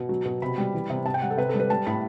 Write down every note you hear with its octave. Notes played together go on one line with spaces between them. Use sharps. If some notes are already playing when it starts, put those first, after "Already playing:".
Already playing: B2
F#3
B2
C3 B5
G3
E3
C3
C3 A5
G5
G3 F#5
A4
C3 B4
A4
G3
B4
G3 A5
A2 B5